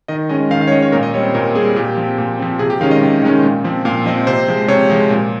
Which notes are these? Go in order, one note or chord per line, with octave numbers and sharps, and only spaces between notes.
D#3 D#5
G#3 C#4 D#5
D#3 F5
F5
C#5
G#3 C#4 D#5
C#5
A#2 A#4
D#5
G3 C4 C#5
C5
A#2 A#4
G3 C4 G#4
A#2 G4
F3 C4
A#2
F3 C4
C3 G#4
G4
D#3 G#3 C#4 F5
D#5
C3
D#3 G#3 C#4
A#2
F3 C4
A#2 F5
F3 C4 D#5
C3 C5
F3 G#3
C3 C#5
F3 G#3
A#2